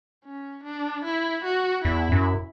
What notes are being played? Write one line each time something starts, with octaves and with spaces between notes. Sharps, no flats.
C#4
D4
E4
F#4
E2 E4
F#2